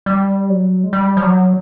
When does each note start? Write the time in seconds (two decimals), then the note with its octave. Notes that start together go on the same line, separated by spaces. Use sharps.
0.06 G3
0.49 F#3
0.84 G#3
0.93 G3
1.17 F3
1.23 F#3